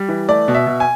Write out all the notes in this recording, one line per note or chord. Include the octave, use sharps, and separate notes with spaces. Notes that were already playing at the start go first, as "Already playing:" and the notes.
Already playing: G3
E3
A3 D5
B2
E5
B2
G#5